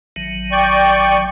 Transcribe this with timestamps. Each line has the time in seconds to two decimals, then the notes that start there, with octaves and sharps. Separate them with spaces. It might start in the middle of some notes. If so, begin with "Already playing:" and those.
0.16 A1 D#3 F#3
0.52 D5 G5 C#6